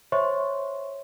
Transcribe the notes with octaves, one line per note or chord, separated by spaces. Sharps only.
C5 C#5 E5 C6 C#6